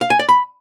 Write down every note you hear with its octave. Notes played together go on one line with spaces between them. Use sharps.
F5
G#5
D5
B5